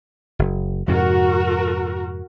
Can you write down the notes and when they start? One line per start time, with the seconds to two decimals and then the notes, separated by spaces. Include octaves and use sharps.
0.39 F#1
0.88 F2 G#2 C3 F#4 A#4